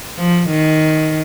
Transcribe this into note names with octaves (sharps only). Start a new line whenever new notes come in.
F3
D#3